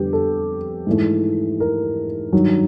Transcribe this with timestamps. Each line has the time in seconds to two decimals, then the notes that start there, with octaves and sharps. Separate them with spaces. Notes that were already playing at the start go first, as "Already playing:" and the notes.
Already playing: F2 D3 G3 B3 G4
0.13 A4
0.87 G#2 E3 A3
1.60 A#4
2.33 G2 D#3 F#3